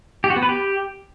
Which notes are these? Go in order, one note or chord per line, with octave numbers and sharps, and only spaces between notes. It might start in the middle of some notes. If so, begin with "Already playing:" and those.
G4
F#4
B3
B4
G4